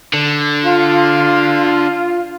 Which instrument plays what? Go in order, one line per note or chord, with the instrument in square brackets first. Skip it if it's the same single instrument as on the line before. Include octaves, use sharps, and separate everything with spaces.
[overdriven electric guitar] D3
[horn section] F4